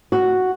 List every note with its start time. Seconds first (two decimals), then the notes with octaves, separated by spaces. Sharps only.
0.12 F#4